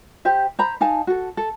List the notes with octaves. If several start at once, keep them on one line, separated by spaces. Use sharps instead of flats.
G4 C5 E5
C5 A#5 B5
D#4 F5 G#5 A5
F#4 A4
A4